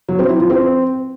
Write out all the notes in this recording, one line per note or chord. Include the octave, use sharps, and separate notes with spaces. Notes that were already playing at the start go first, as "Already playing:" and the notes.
F#3
C4
E4
F3
C4